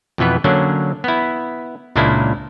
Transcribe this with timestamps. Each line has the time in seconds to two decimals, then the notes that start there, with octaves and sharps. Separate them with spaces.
0.18 F2 B2 E3 B3 B4
0.44 D3 F#3 A#3 C#4 D4
1.04 B3 E4
1.96 C#2 A#2 G#3 A#3 D4 E4